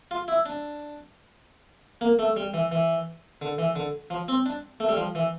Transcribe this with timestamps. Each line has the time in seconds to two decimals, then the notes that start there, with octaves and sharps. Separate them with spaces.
0.11 F4
0.28 E4
0.46 D4
2.01 A#3
2.19 A3
2.37 G3
2.54 E3
2.72 E3
3.42 D3
3.58 E3
3.76 D3
4.10 F3
4.28 C4
4.46 D4
4.80 A3
4.89 G3
4.97 F3
5.15 E3